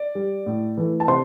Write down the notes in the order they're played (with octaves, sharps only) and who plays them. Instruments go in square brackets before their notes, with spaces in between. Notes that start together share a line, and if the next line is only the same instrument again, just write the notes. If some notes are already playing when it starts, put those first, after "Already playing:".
Already playing: [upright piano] D5
G3
A2
E3 A3
A5
C3 C5 C6